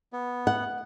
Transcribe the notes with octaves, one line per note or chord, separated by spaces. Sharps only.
B3
F#5